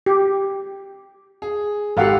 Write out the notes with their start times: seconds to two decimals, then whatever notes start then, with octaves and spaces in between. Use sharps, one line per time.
0.06 G4
1.42 G#4
1.97 G#1 G4 A4 F5 F#5